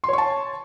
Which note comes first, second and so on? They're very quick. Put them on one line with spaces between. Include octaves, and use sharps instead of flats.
C6 C#5 C#6 A5